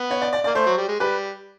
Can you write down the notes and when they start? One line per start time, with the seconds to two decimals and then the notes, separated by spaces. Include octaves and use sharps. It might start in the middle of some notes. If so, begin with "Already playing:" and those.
Already playing: B3
0.11 C#5
0.22 D5
0.33 D5
0.44 D5
0.47 A#3
0.55 A3 C5
0.67 F#3
0.78 G3
0.89 G#3
1.00 G3 B4